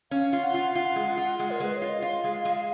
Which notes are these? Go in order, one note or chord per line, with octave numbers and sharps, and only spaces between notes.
C#4 F5
F4
F#5
F4
F4 F#5
G#3
F4
G#3
A#4
G#3 B4
C#5
F4
D#5
F4 F5
G#3
G#3